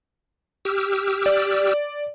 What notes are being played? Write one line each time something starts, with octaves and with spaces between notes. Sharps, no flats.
G4 E6 F6
D5